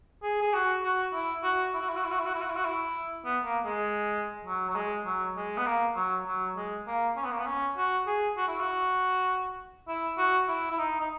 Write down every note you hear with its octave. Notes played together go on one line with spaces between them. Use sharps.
G#4
G#4
F#4
F#4
E4
F#4
E4
F#4
E4
F#4
E4
F#4
E4
F#4
E4
F#4
E4
F#4
E4
B3
A#3
G#3
F#3
F#3
G#3
F#3
G#3
B3
A#3
F#3
F#3
G#3
A#3
C#4
B3
A#3
B3
C#4
F#4
G#4
F#4
E4
F#4
E4
F#4
E4
E4
D#4
D#4